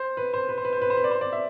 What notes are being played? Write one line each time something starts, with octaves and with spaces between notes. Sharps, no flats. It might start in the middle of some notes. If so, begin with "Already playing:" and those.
Already playing: C5
B4
C5
B4
C5
B4
C5
B4
C5
B4
D5
C5
D5
E5